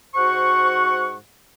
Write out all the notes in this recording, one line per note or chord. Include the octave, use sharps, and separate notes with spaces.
G#2 F#4 C5 F#5 C#6